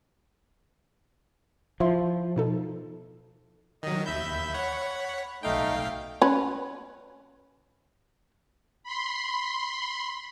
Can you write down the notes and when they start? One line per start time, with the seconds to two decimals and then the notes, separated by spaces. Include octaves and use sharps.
1.80 F3 E4 E5 C6
2.36 B2 D#4 A4
3.83 D#3 F#3 D#5
4.06 D#2 E5 B5 G6
4.54 C#5 F#5
5.43 B1 A3 D#4 F5 G5
6.22 C#4 B4
8.84 B5 C6